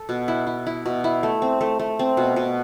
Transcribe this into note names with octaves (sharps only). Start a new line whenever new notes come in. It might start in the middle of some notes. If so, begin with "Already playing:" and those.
Already playing: A4
B2
E4
E4
E4
B2
E4
A3
C4
A3
A3
C4
B2
B2